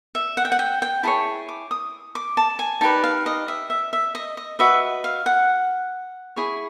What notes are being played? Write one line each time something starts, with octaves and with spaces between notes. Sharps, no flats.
E5
F#5
G5
F#5
G5
G5
E4 G#4 C#5 A5
D6
D#6
D6
A5
G#5
D#4 G4 B4 D5 A5
F5
D#5
E5
E5
E5
D#5
D#5
F#4 B4 D#5 E5
F5
F#5
E4 G#4 C#5